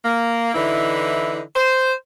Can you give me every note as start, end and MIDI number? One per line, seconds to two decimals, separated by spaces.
0.04 0.53 58
0.54 1.41 50
0.54 1.41 52
0.54 1.41 63
0.54 1.41 64
1.56 1.93 72